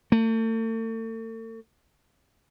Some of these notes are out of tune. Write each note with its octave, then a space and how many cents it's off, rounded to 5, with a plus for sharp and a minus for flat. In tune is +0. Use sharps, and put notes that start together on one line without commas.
A3 +40